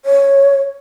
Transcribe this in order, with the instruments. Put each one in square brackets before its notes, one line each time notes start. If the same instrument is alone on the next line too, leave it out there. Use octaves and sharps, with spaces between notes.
[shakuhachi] C#5